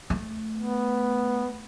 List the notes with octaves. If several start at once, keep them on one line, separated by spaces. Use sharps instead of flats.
A3
B3